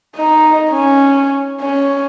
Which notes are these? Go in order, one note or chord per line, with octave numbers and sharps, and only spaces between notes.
D#4
C#4
C#4